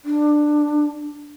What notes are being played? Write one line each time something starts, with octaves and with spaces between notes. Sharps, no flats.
D4